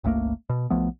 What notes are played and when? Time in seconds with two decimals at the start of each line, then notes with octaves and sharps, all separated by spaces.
0.04 G1 C#2 A3 A#3
0.50 B2
0.70 B1 F3 A3 B3